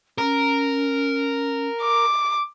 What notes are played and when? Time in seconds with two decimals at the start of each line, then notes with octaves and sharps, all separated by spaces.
0.18 C#4 A#4
1.82 D6